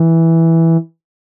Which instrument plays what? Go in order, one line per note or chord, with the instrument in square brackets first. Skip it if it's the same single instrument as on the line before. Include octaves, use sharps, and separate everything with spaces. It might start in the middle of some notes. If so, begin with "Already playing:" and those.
Already playing: [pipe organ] E3